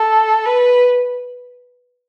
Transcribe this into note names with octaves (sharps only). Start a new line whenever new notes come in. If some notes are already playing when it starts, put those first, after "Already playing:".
Already playing: A4
B4